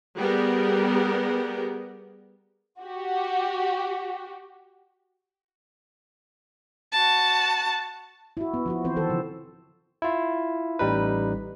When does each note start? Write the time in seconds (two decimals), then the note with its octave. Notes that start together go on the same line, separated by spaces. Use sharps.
0.16 G3 B3 G4 G#4 A#4
2.81 F#4 G4
6.92 F#4 A5
8.37 E4 F#4
8.54 B3
8.66 F3 E4 F#4
8.84 E3 C4 C5
8.96 D#3 E3 A4
9.10 C#3 F3
10.02 E4 F4
10.79 A1 G3 D#4 B4